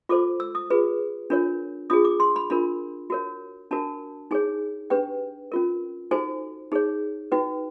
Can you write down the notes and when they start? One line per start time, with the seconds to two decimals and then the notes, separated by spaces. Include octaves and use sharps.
0.09 F4 A4 C5 D6
0.40 E6
0.55 D#6
0.70 F4 G#4 B4
1.30 D4 F4 A#4 C#5
1.90 D4 F4 G#4 D#6
2.05 D6
2.20 C6
2.36 B5
2.50 D4 F4 A#4 B5
3.10 F#4 A#4 C#5
3.71 D4 F#4 A#4 A5
4.31 D#4 G#4 C#5 G#5
4.90 D4 G4 B4 G5
5.52 C#4 F4 A#4
6.11 D#4 F#4 A4 C5 G#5
6.72 D#4 G#4 C#5
7.32 D#4 F#4 B4 G5